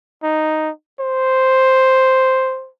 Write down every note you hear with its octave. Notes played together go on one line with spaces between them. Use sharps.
D#4
C5